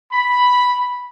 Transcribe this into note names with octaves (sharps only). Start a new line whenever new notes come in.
B5